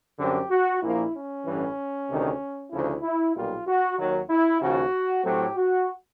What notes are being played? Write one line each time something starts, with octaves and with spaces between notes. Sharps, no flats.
F#2 D3 G3 C4 G4
F#4
A#1 A#2 F3 A#3 E4
C#4
A1 G2 E3
D2 C3 D#3
D2 C#3 F3 E4
E4
B1 A#2 G3 A#3 F4
F#4
D#2 D#3 F#3
E4
D#2 C#3 F3 F#4
A2 F#3 A3 C4 G4
F#4